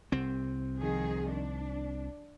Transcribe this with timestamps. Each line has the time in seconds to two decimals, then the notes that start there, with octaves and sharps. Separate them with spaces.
0.12 C2 C4
0.78 D#3 F3 G#4
1.31 D4